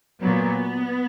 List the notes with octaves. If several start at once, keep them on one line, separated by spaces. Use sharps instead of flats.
F#3 B3
A#2